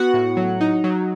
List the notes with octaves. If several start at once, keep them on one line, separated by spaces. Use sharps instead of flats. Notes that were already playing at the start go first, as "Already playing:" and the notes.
Already playing: B3 F#4 F#5
A2
F#3
D#4
F#3